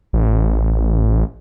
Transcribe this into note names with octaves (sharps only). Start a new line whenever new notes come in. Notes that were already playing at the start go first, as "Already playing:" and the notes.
A1